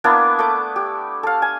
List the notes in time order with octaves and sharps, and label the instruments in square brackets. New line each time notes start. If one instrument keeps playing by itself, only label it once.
[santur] A#3 B3 D4 E4
A3 D6
G4
A4 F5
G#5